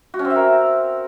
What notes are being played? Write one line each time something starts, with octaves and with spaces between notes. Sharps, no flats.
F#4
C#4
C4
E5
A#4